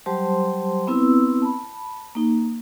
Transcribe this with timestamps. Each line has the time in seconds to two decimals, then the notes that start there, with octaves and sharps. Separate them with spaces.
0.06 F#3 G3 G4 C5 A5 C6
0.87 B3 C4 E4 B4 E6
1.42 A5 B5
2.15 A#3 D#4